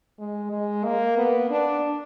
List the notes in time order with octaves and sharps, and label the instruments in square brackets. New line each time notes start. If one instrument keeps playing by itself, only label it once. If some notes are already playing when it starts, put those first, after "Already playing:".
[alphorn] G#3
G#3
A#3
B3
D4